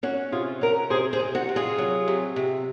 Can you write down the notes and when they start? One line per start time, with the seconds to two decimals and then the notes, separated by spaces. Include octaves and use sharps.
0.03 C#4 F#4
0.32 C3 F4 G#4
0.61 C#4 F#4 A#4
0.90 C3 G#4 C5
1.13 G#4 C5
1.20 C3
1.35 F#4
1.49 C3
1.56 F4 G#4
1.78 F#3
2.08 C3
2.36 C3